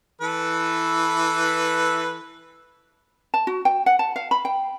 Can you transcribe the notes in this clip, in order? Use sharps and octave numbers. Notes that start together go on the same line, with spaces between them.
E3 A4 B4
A5
F#4
G5
F#5
A5
F5
B5
G5